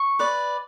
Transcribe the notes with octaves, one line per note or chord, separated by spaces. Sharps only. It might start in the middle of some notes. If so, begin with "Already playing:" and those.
Already playing: C#6
B4 D5